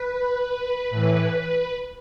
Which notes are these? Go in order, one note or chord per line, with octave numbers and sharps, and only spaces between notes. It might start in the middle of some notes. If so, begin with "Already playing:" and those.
Already playing: B4
A2 E3